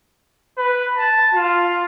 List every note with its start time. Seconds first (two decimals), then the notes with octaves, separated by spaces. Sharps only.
0.58 B4
0.97 A5
1.34 F4